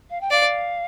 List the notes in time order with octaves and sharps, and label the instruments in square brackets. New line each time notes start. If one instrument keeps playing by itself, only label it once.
[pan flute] F5
G5
[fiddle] D5 [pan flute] F5